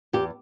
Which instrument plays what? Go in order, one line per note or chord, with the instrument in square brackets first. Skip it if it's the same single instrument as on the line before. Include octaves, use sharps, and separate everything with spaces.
[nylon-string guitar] E2 G4